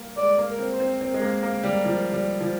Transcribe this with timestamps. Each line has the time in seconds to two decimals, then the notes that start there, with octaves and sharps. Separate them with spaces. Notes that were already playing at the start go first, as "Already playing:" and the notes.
Already playing: G3 A#3
0.17 G#3 D5
0.38 A#3
0.45 A#4
0.59 C4
0.72 C5
0.80 C4
1.00 C4 A#4
1.14 G#3
1.22 A#3
1.43 A#3
1.63 G3
1.85 F3
2.12 G3
2.40 F3